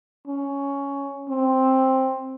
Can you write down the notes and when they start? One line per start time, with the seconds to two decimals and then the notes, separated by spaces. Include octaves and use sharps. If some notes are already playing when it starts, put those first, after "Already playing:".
0.27 C#4
1.29 C4